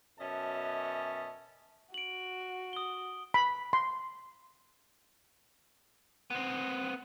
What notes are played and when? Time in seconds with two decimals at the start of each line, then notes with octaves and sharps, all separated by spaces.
0.20 F#2 B2 C#4 D#5 E5 A5
1.94 F#4 D7 F#7
2.73 D#6 G7
3.34 B5
3.73 C6
6.30 B3 C4